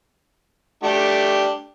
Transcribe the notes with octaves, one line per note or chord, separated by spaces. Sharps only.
A3 D4 G4